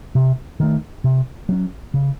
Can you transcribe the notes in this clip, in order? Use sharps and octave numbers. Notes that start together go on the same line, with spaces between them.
C3
D#3 A3
C3
F#3 C#4
C#3